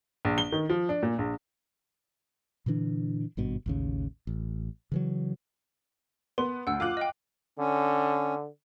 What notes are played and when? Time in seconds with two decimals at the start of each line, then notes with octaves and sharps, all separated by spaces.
0.25 A#1
0.38 G7
0.52 D#3
0.70 F3
0.89 D4
1.03 A#2
1.19 A#1
2.66 A#2 D3 E3 D4
3.37 G#1 G2 B2
3.66 A1 D#2 C#3
4.27 A1
4.92 C#3 E3 F#3
6.38 B3 C6
6.67 D2 F#5 E6
6.80 F4 D6 F#6
6.97 D#5 G5
7.59 D3 C#4